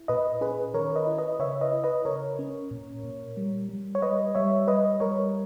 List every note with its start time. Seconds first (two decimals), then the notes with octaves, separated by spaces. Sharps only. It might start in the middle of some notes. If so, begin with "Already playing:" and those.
Already playing: E4
0.08 A#2 B4 D#5
0.41 C#4 G#4 B4
0.74 D#3 A#4 C#5
0.96 B4 D#5
1.07 E4
1.18 B4 D#5
1.39 C#3 C#5 E5
1.61 B4 D#5
1.72 E4
1.84 B4 D#5
2.05 C#3 A#4 C#5
2.39 C#4
2.71 A#2
3.03 A#2
3.37 G3
3.69 G3
3.95 C#5
4.02 G3 B4 D#5
4.35 G3 C#5 E5
4.67 G3 B4 D#5
5.00 G3 A#4 C#5